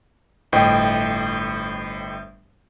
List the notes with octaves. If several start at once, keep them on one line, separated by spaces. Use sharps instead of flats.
G1 A2 C5 D#5 G5